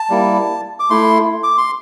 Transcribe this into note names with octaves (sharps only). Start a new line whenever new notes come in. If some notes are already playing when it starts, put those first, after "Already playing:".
Already playing: A5
G3 A#3 E4
D6
A3 E4 C6
D6
C6